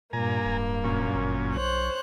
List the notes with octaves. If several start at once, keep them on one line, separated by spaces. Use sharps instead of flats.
G2 A#2 A#3 G#5 A#5
D1
F#2 A#2 C#4
G1
B1 C5 C#5 F#6